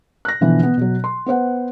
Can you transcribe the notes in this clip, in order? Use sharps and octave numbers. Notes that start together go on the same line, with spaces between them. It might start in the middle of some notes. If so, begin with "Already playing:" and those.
F#6 A#6
B2 D3 E3 F3 B3
B3
B2 F#3
C6
B3 B4 C5 F#5